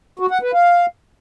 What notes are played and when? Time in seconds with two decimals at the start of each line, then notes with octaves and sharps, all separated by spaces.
0.19 F#4
0.31 F#5
0.42 B4
0.54 F5